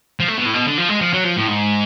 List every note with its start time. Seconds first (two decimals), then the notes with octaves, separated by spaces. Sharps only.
0.20 F3
0.28 A3
0.38 B2
0.46 A2
0.54 B2
0.67 D3
0.78 F3
0.89 G#3
1.01 F3
1.13 F#3
1.24 F3
1.37 A2
1.48 G#2